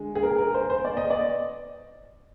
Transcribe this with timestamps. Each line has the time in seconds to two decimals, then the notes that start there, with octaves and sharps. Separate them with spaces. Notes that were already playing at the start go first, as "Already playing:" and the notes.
Already playing: D3 G#3
0.15 G#4
0.23 A#4
0.30 G#4
0.38 A#4
0.54 C5
0.70 C5
0.85 D5
0.97 D#5
1.10 D5